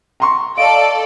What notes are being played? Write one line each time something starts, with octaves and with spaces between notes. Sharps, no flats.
A#5 C6 C#6
A4 D5 D#5 F5 D7